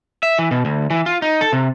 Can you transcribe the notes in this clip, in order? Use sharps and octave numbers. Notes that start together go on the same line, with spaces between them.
E5
E3
B2
D2
E3
F4
D#4
A4
C3